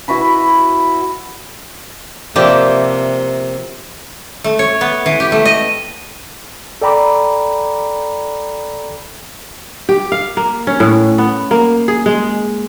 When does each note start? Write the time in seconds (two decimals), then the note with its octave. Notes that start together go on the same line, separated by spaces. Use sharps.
0.08 E4 F#4 B4 B5
2.36 C3 F3 A#3 G4 D5 E5
4.44 A3
4.59 C#5
4.81 B3
5.06 E3
5.20 G4
5.32 A3
5.45 D#5
6.82 A4 D5 G5 A#5 B5 D6
9.89 G4
10.12 F5
10.37 A#3
10.67 C#4
10.80 A2
11.18 B3
11.51 A#3
11.88 G#4
12.06 G#3